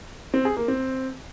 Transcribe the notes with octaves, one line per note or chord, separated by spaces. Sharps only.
C4
G#4
A#3
C4